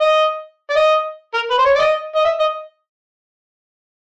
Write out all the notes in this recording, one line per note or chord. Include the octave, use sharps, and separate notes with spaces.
D#5
D5
D#5
A#4
B4
C5
C#5
D5
D#5
D#5
E5
D#5